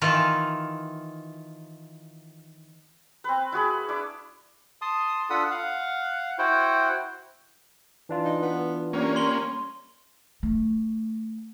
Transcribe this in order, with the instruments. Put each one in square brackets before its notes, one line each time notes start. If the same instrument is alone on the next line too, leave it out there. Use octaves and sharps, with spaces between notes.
[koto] D#3 E3 F4
[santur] C4 B4
E4 F#4 G#4 B5
D4 E4 D6
[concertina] A5 C6 D#6
D4 F4 A4 F#5 B5 D#6
F5 F#5
E4 F#4 C5 F#5 G5
[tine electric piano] E3 D4 F4
[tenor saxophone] D#4
B3
[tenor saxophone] G3 [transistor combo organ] A#3 C#4
[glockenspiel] C6 G7
[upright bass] A3